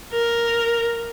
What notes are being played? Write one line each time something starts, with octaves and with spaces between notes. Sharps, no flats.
A#4